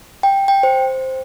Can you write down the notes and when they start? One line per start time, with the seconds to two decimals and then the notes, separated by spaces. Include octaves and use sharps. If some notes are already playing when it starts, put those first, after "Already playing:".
0.23 G5
0.48 G5
0.63 C5